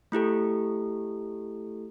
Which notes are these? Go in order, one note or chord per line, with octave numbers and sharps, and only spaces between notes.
A3 E4 G4 A4